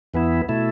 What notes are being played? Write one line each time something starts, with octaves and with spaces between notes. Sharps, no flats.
E2 E3 B3 E4
B2 A3 E4